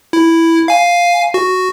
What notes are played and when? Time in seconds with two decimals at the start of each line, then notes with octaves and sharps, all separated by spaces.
0.13 E4
0.68 F5 G#5
1.34 F#4